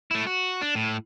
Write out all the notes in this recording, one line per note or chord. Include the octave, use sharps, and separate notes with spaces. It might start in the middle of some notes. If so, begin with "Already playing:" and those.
A3 E4
F#4
D4
A2